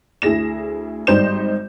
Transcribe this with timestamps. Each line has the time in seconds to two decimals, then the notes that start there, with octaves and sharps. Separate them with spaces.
0.22 D2 E4 G#4 A#6 E7
1.07 G#1 G3 D#4 C5 G6 E7